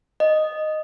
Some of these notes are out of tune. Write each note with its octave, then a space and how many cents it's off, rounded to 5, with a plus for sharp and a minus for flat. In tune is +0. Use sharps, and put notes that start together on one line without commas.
D#5 -5